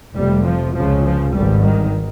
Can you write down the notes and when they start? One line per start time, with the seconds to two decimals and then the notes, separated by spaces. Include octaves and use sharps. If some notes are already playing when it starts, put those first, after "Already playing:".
0.14 F1 F2 C3 G3
0.45 F3
0.75 C#2 C#3 F3
1.04 F3
1.34 G#1 G2 G3
1.64 D#3